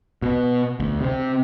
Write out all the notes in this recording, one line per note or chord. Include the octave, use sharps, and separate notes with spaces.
B2
D2
C3